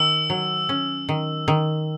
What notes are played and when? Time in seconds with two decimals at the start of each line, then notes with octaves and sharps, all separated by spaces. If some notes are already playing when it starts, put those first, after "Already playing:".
Already playing: D#3 E6
0.30 F#3
0.69 C#4
1.09 D#3
1.48 D#3